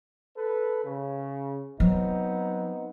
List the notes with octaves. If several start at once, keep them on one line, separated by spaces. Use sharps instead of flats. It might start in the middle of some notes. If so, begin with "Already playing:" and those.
A4 B4
C#3
F#3 B3 C4 D#4